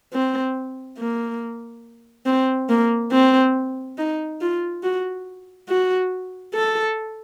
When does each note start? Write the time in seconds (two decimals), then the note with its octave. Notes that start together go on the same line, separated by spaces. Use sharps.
0.13 C4
0.98 A#3
2.26 C4
2.70 A#3
3.12 C4
3.98 D#4
4.41 F4
4.83 F#4
5.69 F#4
6.54 A4